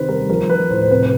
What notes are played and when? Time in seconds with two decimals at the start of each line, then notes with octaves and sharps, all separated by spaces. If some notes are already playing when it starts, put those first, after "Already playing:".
Already playing: C3 D#3 B4 C5
0.09 G3 A#4
0.29 F3 A#4
0.49 F3 B4
0.70 A2 C5
0.83 C5
0.91 C3 B4
1.03 B4